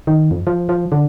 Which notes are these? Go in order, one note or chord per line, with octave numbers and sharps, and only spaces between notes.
D#3
F2
F3
F3
D3